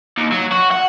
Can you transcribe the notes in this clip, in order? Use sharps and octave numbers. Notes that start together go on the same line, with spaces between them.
D#2
F#3
F#4
F#5